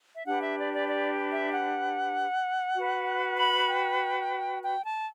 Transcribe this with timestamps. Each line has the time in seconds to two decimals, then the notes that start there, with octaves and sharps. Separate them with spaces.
0.14 E5
0.26 D4 G4 B4 F#5
0.41 E5
0.57 D5
0.73 D5
0.88 D5
1.30 E5
1.51 F#5
2.75 F#4 B4
3.38 B5
3.69 G5
4.63 G5
4.84 A5